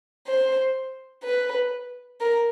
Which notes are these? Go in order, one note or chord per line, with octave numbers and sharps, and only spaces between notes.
C5
B4
A#4